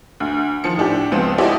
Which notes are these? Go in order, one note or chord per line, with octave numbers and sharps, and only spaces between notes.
D2
D#3 F3 C#7
A2 D4 G4
C#2 F3 B3 C4
E4 F#4 G4 A4 D5 D#5